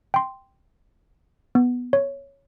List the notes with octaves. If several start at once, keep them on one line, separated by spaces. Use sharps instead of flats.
G5 C6
B3
C#5